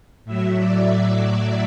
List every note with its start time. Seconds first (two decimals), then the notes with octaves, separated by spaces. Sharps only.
0.25 A2 F#3 E5
0.57 D5